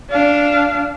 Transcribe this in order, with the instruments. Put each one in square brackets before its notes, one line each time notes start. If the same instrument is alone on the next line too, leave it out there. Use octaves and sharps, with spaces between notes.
[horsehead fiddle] D4 F5